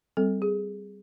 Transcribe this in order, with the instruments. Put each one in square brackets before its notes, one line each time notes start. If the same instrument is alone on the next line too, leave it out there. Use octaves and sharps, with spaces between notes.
[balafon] G3 C4 A4
G#4